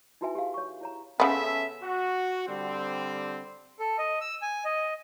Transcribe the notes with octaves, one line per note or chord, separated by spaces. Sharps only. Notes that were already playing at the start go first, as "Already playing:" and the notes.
D#4 E4 F#4 B4 E5 G#5
G4 G#4 F5
C#5 C#6
E4 C#5 A#5
C#3 B3 C#4 A4 E5
F#4
D3 G3 C4
A4
D#5
E6
G#5
D#5